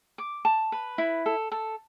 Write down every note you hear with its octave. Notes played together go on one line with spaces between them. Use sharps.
D6
A5
B4
E4
A4
A4